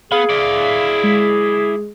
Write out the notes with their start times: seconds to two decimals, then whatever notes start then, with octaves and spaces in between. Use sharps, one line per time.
0.12 B3 G#4 F5
0.29 E4 D5
1.04 G#3